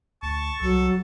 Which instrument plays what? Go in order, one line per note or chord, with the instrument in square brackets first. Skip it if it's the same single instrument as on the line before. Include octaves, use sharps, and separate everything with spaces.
[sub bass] D2 [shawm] A5 [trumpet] C#6
[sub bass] C2 [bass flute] F#3 [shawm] A4